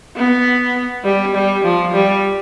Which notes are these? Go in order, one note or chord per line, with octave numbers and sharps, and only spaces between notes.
B3
G3
G3
F3
G3